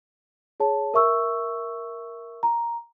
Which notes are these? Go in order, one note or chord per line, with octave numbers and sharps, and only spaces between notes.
G#4 C#5 A5
A#4 E5 C#6 E6
A#5